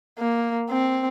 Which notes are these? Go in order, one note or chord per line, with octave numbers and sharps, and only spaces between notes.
A#3
C4